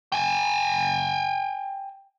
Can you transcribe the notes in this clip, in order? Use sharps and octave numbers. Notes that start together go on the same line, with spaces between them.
G5 G#5